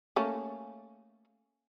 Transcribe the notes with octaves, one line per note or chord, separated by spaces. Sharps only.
A3 A#3 C#4